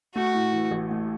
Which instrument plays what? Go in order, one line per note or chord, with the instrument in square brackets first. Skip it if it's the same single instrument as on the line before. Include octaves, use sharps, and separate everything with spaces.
[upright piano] A3 [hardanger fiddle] F#4
[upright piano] A2
E3
A1
A3